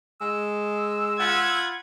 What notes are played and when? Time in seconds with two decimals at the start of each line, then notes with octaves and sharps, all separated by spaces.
0.21 G#3 E6
1.19 F4 F#5 B5 G#6